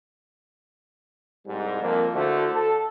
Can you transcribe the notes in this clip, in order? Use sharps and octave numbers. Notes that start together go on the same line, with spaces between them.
C2 G#2 G3
F2 A#3
D3 A3 E4 F#4 C5
A4